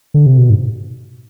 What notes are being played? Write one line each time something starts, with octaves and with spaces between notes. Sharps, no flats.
D3
C3
B2
G#2